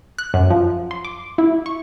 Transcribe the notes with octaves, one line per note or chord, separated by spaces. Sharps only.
F#6
F#2
F3
C6
D6
E4
C#6